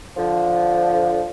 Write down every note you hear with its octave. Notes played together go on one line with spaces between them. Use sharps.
D3 F3